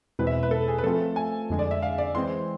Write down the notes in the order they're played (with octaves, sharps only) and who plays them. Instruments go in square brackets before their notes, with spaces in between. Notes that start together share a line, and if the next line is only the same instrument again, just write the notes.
[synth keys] E2 B2 G#3 C4 E4 [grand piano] B4
[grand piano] E5
B4
A4
G#4
B4
[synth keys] F3 A3 C4 F4 [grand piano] A4
[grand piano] G#5
[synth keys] F2 D3 G#3
[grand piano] D5
E5
F5
D5
[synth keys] E3 G#3 C4 [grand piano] C6